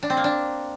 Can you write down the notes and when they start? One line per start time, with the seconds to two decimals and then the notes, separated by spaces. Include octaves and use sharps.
0.03 D4
0.10 C4
0.17 A#3
0.24 D4